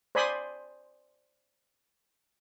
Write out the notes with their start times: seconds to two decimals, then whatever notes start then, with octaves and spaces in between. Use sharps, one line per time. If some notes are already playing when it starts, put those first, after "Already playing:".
0.15 C5 D5 G#5 B5 C6 D#6